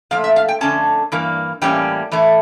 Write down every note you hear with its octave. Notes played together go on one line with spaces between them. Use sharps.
A#2 F3 A3 F5
E5
F5
G5
F2 D3 A3 C#4 A5
G2 E3 A#3
A2 E3 G3 A#3 C#4 G5
A2 E3 A3